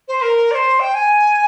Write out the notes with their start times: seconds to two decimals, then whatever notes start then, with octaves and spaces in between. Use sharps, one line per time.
0.08 C5
0.22 A#4
0.51 D5
0.55 C5
0.80 G5
0.94 G#5